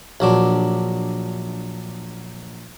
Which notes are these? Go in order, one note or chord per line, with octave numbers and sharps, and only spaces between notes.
A#1 F#3 D4